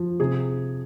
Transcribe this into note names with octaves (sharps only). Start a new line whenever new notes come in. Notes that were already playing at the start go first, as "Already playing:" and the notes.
Already playing: F3
C3 G#4